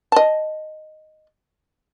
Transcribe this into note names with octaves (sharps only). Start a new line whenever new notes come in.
D#5 A5